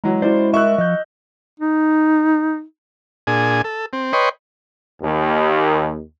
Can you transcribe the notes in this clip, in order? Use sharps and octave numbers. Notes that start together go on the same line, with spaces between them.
E3 F#3 G#3 A#5
C#4 E4 F#4 C5 D5
A#4 D#5 E5 C#6 E6 F#6
F3 D#5 G6
D#4
A#2 D4 G#4 G#5
A4
C4
B4 C#5 D#5 G5 C6
D#2